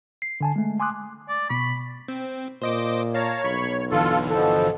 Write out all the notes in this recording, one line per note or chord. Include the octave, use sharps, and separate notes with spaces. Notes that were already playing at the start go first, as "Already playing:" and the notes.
C7
D3 G#5 A5
G#3 A3
G#5 C6 D6 D#6 F#6
D5
B2 B5 C#6
C4
A#2 C5 D#5 D6
C#5 F5 A5 A#5
B1 B5 C#6 B6
G1 D3 E3 F4 A4
B2 F3 A4